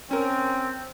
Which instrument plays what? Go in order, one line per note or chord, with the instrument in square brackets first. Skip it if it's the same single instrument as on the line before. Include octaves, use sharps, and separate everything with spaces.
[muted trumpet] C4 [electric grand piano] C#4 A#4